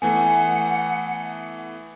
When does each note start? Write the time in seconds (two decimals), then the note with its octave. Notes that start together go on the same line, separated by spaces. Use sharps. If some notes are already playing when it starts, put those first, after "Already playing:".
0.02 E3 A3 B3 F#5 G#5